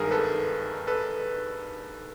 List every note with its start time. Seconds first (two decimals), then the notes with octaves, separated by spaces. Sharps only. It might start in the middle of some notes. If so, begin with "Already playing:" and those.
Already playing: G#1 G2 D#3 G#4 A#4
0.11 A4 B4
0.87 A4 B4